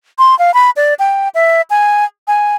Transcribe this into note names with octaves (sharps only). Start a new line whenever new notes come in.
C6
F5
B5
D5
G5
E5
G#5
G#5